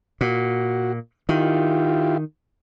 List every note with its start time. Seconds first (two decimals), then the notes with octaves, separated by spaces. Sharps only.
0.21 A#2 F#4
1.29 D#3 E4 F4 G4